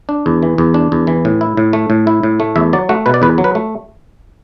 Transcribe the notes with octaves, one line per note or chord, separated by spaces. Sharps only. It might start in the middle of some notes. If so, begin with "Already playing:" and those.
D4
E2
E3
E2
D4
E2
E3
A2
E4
A2
A3
A2
E4
A2
A3
E2 E5
F#3 D5
A3 F#4
B2 B4
D5
E2 B4
F#3
B4
A3